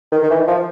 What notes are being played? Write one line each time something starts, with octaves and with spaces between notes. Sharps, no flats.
D#3
D#3
E3
F3